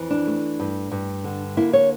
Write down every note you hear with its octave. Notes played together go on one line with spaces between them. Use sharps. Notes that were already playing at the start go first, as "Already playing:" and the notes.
Already playing: F2 E3
D4
A3
G2
G2
D3
A#3 E4
C#5